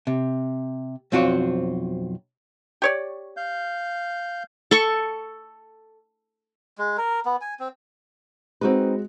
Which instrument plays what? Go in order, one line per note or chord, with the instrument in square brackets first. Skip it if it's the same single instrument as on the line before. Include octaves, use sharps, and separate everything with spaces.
[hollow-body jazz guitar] C3
B1 F2 C4 F4 F#4 D5
[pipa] G4 C#5 D5
[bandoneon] F5 G6
[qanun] A4 C#6
[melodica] G#3
A#4
B3
G#5
C4
[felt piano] G#3 F#4 [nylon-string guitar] C4 D#4 B4